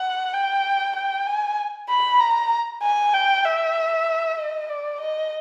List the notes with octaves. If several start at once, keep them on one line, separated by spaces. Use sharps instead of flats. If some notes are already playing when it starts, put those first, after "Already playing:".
Already playing: F#5
G5
G5
G#5
B5
A#5
G#5
G5
E5
D#5
D5
D#5